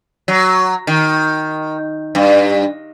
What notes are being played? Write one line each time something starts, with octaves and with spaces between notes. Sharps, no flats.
F#3
D#3
G2